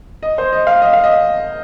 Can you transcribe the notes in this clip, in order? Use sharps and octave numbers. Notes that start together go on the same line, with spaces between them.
D#5
C5
D#5
F5
D#5
F5
D#5